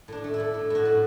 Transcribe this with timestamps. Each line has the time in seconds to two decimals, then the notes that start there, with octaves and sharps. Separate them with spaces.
0.08 A2 D4
0.24 A3
0.34 E4
0.40 A3
0.54 A2
0.70 A2 F#4
0.85 A2